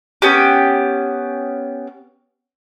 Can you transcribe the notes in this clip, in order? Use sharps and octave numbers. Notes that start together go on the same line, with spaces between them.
B3 C#4 G4